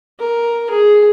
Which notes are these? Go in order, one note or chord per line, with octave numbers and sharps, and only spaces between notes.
A#4
G#4